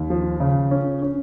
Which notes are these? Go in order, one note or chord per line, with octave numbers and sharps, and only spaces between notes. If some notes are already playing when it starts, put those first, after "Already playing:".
Already playing: D#2
F3
C#3
C#4
C#4